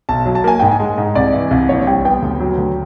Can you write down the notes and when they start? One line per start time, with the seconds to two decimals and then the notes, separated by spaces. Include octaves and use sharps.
0.09 B1 A5
0.26 F#3
0.35 A5
0.44 A#3 G#5
0.60 G#2 G5
0.71 G#5
0.80 G#3
0.98 G#2
1.15 C2 D5
1.33 E3
1.51 C2
1.69 A#1 C#5
1.87 G3 G5
2.05 B3 G5
2.22 D2
2.40 F#3
2.58 D2